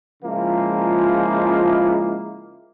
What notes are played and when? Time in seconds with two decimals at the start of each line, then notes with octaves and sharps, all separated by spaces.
0.23 C#3 F3 G#3 A#3 E4 F4